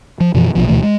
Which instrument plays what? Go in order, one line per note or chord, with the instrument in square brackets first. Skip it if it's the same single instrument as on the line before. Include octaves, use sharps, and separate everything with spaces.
[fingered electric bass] F3
F#2 B2 E3 F3
A#1 B2 F3
D2 B2 E3 A3
G#3